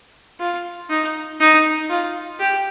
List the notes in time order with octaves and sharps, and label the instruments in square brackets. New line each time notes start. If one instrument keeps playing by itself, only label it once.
[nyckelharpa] F4
D#4
D#4
F4
G4